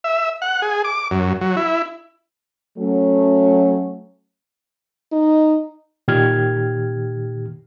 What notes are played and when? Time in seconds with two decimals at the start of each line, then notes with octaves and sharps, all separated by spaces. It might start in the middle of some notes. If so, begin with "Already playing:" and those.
0.04 E5
0.42 F#5
0.62 G#4
0.85 D6
1.11 F#2
1.41 F#3
1.57 E4
2.79 F#3 A3 C#4
5.12 D#4
6.08 A#2 D#3 G4 F6 G#6